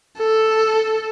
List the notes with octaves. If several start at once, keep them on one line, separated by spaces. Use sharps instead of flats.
A4